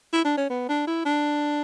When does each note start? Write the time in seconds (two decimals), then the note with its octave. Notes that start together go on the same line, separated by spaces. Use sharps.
0.13 E4
0.25 D4
0.37 C#4
0.50 B3
0.69 D4
0.87 E4
1.06 D4